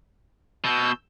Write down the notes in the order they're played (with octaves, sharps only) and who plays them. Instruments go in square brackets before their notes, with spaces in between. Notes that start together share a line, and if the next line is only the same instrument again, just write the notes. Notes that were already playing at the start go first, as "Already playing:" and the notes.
[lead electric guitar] B2 [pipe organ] E6 G6